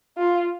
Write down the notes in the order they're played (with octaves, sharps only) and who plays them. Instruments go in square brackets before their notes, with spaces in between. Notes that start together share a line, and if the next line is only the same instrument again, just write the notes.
[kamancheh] F4